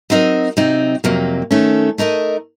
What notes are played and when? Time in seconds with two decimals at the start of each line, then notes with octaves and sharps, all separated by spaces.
0.10 F#3 C4 D#4 A#4 D#5
0.57 C3 F#3 C4 D#4
1.04 F2 C3 F#3 A#3
1.51 D#3 A3 C#4 A4
1.98 A3 D#4 A#4 D#5